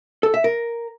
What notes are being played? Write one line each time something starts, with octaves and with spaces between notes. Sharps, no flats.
A4
E5
A#4